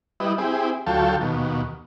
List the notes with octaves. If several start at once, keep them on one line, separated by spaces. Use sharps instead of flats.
G3 E4 B4 D#5
C4 E4 G4 G#4
D2 F#3 F4 A4 G5 A5
D#2 B2